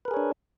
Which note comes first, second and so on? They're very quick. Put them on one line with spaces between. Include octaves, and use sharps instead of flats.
B4 A#4 G#4 C#5 D4